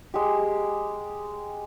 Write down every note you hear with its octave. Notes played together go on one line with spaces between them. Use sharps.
G#3 G4